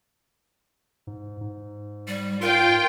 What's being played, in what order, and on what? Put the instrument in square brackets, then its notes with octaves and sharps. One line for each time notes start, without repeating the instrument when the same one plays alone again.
[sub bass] G#2
G#2
[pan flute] G3
[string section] F4 G5 [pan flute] A#4